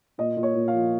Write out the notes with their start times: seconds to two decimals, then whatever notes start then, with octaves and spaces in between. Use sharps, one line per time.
0.18 A#2 D#5
0.37 A#2
0.43 C#5
0.55 A#2
0.68 F5
0.73 F3